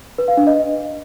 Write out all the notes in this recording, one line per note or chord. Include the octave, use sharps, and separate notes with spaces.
B4
F5
D4
D#5